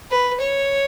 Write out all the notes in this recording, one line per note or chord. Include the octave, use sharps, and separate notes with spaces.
B4
C#5